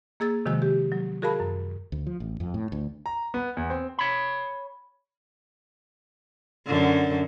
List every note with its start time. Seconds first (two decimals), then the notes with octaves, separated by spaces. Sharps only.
0.20 A#3 G#4 E6 A6
0.46 C3 D#3 F3 G#3 F#4 E6
0.62 G4
0.92 F#3
1.22 F#4 G#4 A#4 F5 A5 B5
1.40 F#2
1.92 D2
2.07 F3
2.20 A1
2.40 F2
2.54 A2
2.72 D2
3.06 A#5
3.34 B3
3.57 E2
3.70 C4
3.99 C#5 B5
6.67 F#2 D3